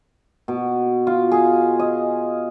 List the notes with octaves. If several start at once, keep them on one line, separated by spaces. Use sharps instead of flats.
B2
F4
G#4
D#5